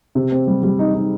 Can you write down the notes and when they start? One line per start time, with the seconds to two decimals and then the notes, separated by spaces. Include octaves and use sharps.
0.15 C3
0.32 C4
0.47 G3
0.63 G3
0.79 D#4
0.94 D#4